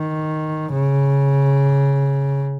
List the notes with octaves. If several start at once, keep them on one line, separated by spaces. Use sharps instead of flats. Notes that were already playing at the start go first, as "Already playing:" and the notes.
Already playing: D#3
C#3